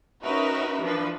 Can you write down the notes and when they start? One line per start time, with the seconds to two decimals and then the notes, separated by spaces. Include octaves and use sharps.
0.24 C#4 D#4 F#4 A#4 B4 E5
0.81 E3 F3 D4 B4